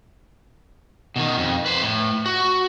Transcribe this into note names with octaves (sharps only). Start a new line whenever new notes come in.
B2 D#3
F2
B4 C5
A2
F#4